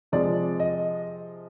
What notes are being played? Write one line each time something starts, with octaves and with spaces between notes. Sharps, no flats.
C3 F3 G#3 D5
D#5